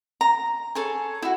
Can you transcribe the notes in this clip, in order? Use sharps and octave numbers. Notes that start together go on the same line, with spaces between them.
A#5
G#4 A4 C#5 G#5
E4 F#4